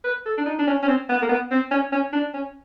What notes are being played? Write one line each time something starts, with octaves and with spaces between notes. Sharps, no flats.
B4
A4
D4
D#4
D4
C#4
C#4
C4
B3
A#3
B3
C4
C#4
C#4
D4
C#4